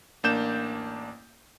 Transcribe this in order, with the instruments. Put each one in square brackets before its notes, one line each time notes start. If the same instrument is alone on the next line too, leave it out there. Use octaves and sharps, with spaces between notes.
[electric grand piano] A1 A#3 D4 G6 E7